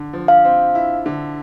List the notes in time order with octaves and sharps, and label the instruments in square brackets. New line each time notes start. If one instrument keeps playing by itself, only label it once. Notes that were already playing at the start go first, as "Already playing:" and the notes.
Already playing: [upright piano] D3
F3
[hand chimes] F5
[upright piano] C4
E4
D3